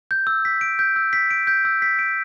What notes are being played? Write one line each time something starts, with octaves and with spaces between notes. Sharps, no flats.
G6
E6
B6
D7
G6
E6
B6
D7
G6
E6
B6
D7